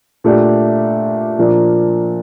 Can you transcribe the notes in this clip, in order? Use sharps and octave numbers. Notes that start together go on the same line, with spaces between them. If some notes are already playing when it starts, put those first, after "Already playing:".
A#2 A3 D4 G4
A#2 F3 A#3 D4